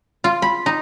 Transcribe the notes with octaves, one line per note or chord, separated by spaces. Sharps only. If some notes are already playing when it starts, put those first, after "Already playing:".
F4
B5
D#4